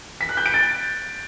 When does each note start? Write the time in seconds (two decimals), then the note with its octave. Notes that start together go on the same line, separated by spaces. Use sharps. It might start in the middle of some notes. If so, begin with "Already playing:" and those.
0.21 B6
0.29 F#6
0.37 G6
0.46 D7
0.54 A6